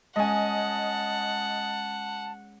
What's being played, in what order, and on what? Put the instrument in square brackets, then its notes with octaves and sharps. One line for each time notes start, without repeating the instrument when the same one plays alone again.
[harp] G#3 C#4 [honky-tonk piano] D#5 G#5 [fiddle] F#5 [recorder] A5